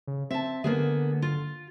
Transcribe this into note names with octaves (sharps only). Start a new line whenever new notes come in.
C#3
C4 E5 A5
D3 A#3 B3 G#4
F4